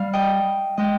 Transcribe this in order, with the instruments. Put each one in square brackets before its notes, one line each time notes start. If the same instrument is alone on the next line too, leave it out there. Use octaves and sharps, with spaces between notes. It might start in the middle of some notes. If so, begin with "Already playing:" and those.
Already playing: [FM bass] G3 [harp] F5
[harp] D#5 G5
[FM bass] G#3 [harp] D#5 G5